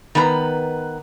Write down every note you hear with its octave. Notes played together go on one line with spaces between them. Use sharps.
D#3 B3 B4 A#5